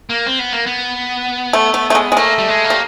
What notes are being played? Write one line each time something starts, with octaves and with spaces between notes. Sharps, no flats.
A#3
C4
B3
A#3
B3
A3
A3
A3
G#3
G#3
A3 A#3
G3
G#3
A#3
G3